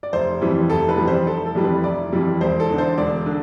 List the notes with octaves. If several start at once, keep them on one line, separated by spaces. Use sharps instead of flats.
D5
F1 C5
F2 E3 G3
F1 A4
B4
F2 E3 G3
C5
F1 A4
A4
F2 E3 G3
B4
F1 D5
F2 E3 G3
E1 C5
A4
E2 D3
C5
E1 D5
D3